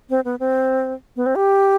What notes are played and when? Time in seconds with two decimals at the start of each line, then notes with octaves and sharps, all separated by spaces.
0.10 C4
0.25 B3
0.40 C4
1.16 B3
1.26 C4
1.36 G4